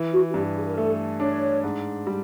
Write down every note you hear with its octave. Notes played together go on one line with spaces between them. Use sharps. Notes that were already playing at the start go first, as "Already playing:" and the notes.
Already playing: E3
F#4
F#4
G2 G4
G#4
A#4
A3 A4
D4 C#5
G#2
G3